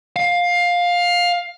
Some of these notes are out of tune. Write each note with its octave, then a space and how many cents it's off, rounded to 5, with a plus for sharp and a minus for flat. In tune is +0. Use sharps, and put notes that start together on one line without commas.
F5 +15